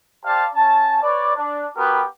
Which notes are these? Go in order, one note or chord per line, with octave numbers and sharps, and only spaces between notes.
G4 C5 D5 F5 A5
C#4 A5
B4 C#5 D5
D4
B3 F#4 G4 A#4 B4